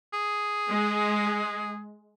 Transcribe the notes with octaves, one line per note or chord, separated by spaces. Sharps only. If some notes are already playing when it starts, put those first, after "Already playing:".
G#4
G#3